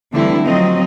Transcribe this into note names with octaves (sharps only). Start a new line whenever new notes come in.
D3 E3 G3 A3 C4 E4
F3 F#3 C4 D#5